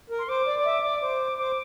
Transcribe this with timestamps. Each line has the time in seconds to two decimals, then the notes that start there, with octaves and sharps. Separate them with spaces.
0.10 A#4
0.19 C6
0.29 C5 D6
0.47 D5
0.59 D5
0.66 E5
0.84 D5
1.02 C5 D6
1.39 C5 D6